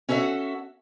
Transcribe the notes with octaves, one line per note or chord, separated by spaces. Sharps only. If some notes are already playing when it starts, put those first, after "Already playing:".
C#4 F#4 A4 A#4 E5 F#5